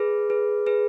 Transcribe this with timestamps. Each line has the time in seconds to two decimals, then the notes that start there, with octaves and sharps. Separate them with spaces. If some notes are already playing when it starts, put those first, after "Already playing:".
Already playing: G#4 B4
0.30 G#4 B4
0.66 G#4 B4